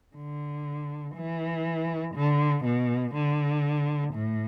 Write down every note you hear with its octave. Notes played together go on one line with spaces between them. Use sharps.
D3
E3
D3
B2
D3
A2